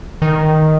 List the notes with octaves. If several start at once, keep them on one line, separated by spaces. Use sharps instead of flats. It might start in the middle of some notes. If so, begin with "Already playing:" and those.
D#3